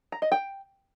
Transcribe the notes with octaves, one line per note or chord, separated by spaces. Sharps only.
A#5
D#5
G5